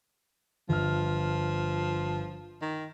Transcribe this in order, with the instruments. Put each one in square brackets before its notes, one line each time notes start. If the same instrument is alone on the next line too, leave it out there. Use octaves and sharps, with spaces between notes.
[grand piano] G1 F6 [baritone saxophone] F3
[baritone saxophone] D#3